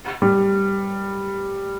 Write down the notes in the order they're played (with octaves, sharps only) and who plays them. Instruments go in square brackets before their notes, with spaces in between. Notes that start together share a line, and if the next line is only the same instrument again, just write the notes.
[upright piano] G3